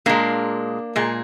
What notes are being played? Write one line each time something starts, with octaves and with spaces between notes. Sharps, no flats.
A#2 G#3 A#3 D4
A#2 G#3